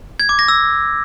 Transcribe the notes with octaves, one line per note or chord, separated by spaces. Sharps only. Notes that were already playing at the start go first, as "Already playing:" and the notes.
G#6
D6
A#6
E6